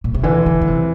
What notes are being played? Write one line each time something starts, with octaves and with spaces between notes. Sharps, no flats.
A#2
C3
D3 E3
D3
D3
C3